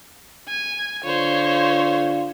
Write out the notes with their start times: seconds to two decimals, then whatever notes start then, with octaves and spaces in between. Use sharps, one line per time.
0.48 G#5
1.04 D3 F4 C5 C#5